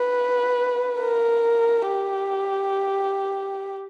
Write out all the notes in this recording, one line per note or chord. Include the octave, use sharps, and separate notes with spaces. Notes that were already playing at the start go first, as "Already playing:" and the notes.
Already playing: B4
A#4
G4